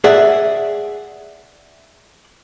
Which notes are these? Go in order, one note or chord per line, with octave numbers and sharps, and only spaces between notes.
G#4 D5 E5 F#5